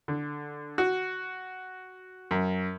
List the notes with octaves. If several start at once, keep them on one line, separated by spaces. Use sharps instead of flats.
D3
F#4
F#2